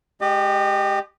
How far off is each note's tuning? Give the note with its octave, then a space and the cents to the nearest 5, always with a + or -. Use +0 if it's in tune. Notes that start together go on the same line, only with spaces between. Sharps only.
G#3 +10 G4 +0 D#5 -35